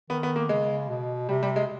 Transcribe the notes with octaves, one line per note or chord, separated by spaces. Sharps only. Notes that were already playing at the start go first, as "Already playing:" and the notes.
D#3 B3
B3
A#3
C#3 G#3
B2
C3 G3
G3
G#3